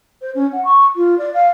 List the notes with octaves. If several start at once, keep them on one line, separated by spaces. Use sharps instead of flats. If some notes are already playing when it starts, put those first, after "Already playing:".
C5
C#4
F#5
C#6
F4
D5
F5